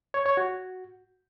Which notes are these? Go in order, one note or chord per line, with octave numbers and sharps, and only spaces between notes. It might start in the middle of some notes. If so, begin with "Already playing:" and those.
C#5
C#5
F#4